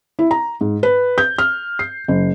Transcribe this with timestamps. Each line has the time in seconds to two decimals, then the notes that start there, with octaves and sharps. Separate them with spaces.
0.19 E4
0.31 A#5
0.61 G#2
0.83 B4
1.18 G6
1.38 F6
1.79 C7
2.08 F#1